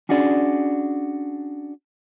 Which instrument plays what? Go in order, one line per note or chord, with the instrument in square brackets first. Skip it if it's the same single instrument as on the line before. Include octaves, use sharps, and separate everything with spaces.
[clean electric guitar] C#4 D4 F#4 G#4 D5